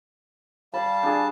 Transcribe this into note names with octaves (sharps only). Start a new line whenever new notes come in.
G3 F5 A5 B5
D4 G#4